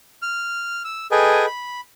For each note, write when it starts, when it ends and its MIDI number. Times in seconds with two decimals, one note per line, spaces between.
0.22 0.82 89
0.85 1.07 88
1.12 1.46 68
1.12 1.46 69
1.12 1.46 71
1.12 1.46 75
1.12 1.46 79
1.12 1.46 80
1.46 1.81 83